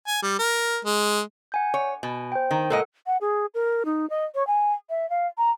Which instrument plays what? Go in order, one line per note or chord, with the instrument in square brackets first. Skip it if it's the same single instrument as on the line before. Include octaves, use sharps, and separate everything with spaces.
[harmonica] G#5
G3
A#4
G#3
[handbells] F#5 G#5 G6
[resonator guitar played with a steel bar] C#5
[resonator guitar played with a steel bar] B2 [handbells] G#5
[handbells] C5 G5
[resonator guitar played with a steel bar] D#3
[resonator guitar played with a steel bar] A#2 G#3 D#5 [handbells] A4 A#4 F#5
[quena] F#5
G#4
A#4
D#4
D#5
C#5
G#5
E5
F5
A#5